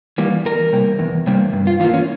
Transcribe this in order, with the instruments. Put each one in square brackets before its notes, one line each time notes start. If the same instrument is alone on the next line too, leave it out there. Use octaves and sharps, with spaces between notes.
[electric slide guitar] E3 G3 A#3
E2 A#4
C3 G3 A#3
E2
C3 G3 A#3
G2
F4
E3 F4
A#3
C#4